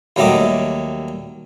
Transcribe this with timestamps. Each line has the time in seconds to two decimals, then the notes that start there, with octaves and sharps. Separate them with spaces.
0.16 D#2 F#3 G3 A3 D#5 D6